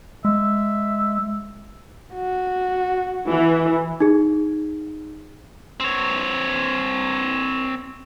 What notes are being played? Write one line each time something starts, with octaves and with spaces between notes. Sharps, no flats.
G#3 E5
F#4
E3
D#4 G#4
C4 C#5